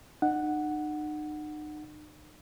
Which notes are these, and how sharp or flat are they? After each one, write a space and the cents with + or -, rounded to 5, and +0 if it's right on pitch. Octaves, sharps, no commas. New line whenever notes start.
D#4 -40 F#5 +0